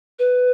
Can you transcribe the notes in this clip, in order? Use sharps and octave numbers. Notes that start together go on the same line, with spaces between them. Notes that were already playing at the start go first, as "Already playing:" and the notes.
B4